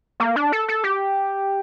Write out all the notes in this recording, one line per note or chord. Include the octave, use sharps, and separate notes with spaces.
A#3
D4
A4
A4
G4